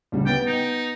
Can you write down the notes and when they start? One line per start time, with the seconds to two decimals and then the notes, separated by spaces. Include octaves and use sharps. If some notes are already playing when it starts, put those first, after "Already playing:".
0.12 D2 C#3 G3
0.26 B3 G5 A6
0.46 D#4